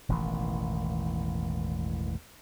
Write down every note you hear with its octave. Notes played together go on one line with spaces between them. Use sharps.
E1 A1 E2 D#3